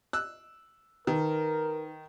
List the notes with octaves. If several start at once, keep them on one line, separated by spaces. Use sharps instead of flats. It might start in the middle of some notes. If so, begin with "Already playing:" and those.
E6 F#6
D#3 D#4 A#4 B4